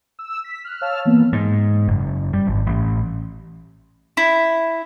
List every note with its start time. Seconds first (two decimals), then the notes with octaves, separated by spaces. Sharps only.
0.19 E6
0.44 B6
0.64 F6 F#6
0.81 C#5 F5 A5 E6 F6
1.05 E3 A#3 B3
1.33 G#2
1.88 F#1
2.33 G3
2.48 G#1
2.67 A1
4.17 E4